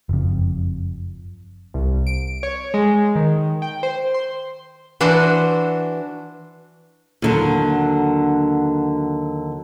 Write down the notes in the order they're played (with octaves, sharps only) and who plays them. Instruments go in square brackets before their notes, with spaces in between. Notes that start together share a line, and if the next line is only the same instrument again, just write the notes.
[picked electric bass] F#1 F2
[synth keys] C2
D7
C#5
G#3
D#3
G5
C5
C6
[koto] E3 D4 F#4 C5
[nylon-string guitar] D#2 D3 F#3